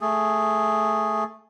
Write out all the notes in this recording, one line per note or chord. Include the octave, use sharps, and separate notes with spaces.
A3 G#4